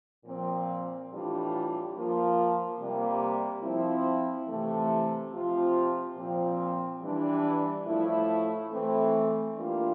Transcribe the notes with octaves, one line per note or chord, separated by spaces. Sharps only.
A#2 F3 C4
A2 E3 G3 D4 F4
F3 A#3 F4
C3 G3 A#3
F3 C4 E4
C3 E3 A3
C3 F3 C4 F4
A#2 F3 C4
E3 G3 D4
A2 F3 A3 E4
E3 A3 C4
E3 G3 A#3 D4 F4